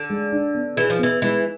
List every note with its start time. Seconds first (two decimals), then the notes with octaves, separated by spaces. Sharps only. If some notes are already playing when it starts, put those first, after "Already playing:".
Already playing: D3
0.10 G#3
0.32 D4
0.55 B3
0.77 E3 G#4
0.90 F3
0.99 E3 B3
1.22 E3 G#3